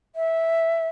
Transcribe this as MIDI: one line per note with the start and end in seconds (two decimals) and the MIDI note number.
0.16 0.88 76